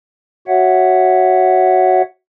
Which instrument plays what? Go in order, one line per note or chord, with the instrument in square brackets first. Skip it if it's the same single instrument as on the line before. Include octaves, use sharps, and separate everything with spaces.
[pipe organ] F#4 C#5 E5 F#5